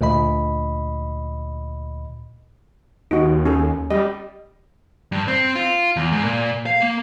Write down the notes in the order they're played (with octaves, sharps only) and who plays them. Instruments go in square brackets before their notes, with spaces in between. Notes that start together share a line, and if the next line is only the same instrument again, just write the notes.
[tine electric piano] D2 A#2 D#5 B5
[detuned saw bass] D#2 [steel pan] D#4 F#4
[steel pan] C#4 G#4 A4
[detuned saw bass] G3 [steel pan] G4 D#5
[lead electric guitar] G2
C4
F4
E2
G#2
A#2
F5
A#3